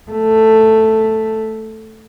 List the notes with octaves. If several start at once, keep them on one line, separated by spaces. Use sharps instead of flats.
A3